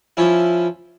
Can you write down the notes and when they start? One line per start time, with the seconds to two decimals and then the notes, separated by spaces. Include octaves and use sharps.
0.17 F3 C#4 E4